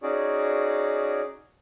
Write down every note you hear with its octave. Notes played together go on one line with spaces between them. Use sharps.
C#4 D#4 F#4 G#4 D5